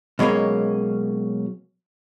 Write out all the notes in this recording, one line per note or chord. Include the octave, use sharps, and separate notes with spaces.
B2 F#3 G#3 A#3 C#4